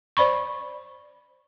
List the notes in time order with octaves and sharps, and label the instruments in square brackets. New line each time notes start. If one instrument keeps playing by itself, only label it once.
[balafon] C5 D5 B5 C#6